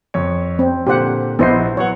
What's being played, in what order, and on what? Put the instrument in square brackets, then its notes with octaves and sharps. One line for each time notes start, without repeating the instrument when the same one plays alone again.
[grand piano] F2 C#5
[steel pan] C4
[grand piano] A#2 D3 [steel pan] G4 C5 F#5
[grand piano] A#1 D#5 C7 [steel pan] B3 E4 C5
[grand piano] F#3 B3 F#5 [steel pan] C#5